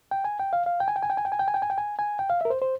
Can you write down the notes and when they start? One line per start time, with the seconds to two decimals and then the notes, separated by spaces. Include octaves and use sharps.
0.11 G5
0.25 G#5
0.39 G5
0.53 F5
0.66 F5
0.80 G5
0.88 G#5
0.96 G5
1.03 G#5
1.10 G5
1.17 G#5
1.25 G5
1.32 G#5
1.39 G5
1.48 G#5
1.54 G5
1.62 G#5
1.70 G5
1.78 G#5
1.99 G#5
2.19 G5
2.30 F5
2.41 A#4 E5
2.50 C5
2.62 C5